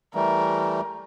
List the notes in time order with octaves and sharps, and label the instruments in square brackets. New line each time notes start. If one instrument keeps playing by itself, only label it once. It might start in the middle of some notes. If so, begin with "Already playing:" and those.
[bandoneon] E3 G3 A3 [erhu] A#4